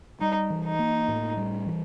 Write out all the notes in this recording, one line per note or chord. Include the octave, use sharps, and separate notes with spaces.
G3 D#4
E3
D#4
A#3
A2
G3
E3